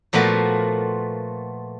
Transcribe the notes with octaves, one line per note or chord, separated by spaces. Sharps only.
A#2 F3 A3 B3 F#4 A#4